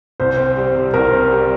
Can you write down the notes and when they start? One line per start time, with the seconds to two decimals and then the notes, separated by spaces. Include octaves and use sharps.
0.20 C2 C5
0.37 C4
0.56 G3
0.75 C3
0.94 C2 A#4
1.12 C4
1.31 G3